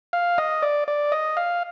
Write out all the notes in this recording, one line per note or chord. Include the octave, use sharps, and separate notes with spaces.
F5
D#5
D5
D5
D#5
F5